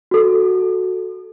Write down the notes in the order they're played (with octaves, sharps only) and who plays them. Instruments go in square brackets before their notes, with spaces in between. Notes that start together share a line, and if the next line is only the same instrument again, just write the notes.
[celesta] F#4 A4